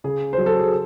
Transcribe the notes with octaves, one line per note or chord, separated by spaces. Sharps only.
C#3 G#4
C5
F#3
A4
G#4